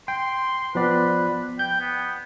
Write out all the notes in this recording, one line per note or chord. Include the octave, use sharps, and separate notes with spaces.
G5 C6
F3 B3 B4 D5
G5 G6
B3